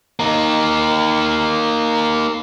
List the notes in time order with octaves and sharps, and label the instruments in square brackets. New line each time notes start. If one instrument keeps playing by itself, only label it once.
[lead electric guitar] A#3 D#4